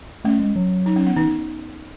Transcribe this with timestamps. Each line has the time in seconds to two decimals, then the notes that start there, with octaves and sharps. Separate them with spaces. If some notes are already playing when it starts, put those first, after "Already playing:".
0.24 A3 C#4
0.39 G#3
0.56 F#3
0.86 D#4
0.96 C#4
1.06 B3
1.17 E3 D#4